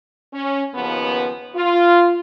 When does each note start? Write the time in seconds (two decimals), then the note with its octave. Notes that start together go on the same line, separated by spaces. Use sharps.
0.34 C#4
0.74 D#2 C#3 F3 B3
1.56 F4